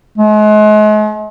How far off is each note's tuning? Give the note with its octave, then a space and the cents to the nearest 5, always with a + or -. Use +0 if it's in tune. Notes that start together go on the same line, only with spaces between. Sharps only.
G#3 +40